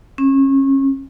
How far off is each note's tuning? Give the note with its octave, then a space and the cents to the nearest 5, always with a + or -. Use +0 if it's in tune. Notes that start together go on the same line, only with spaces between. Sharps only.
C#4 -30